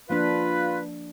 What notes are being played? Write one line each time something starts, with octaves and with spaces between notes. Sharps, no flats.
F3 A#3 D4 F4 B4